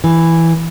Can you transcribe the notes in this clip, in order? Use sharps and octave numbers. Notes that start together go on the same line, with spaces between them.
E3